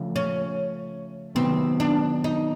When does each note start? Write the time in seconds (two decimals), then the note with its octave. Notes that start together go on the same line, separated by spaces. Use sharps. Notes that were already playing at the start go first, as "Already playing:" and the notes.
Already playing: C#3 F3 A3
0.16 C#4
1.35 C3 D#3 F#3 B3 C4
1.80 D4
2.24 D#4